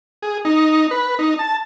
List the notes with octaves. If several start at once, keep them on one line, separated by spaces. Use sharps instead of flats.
G#4
D#4
B4
D#4
A5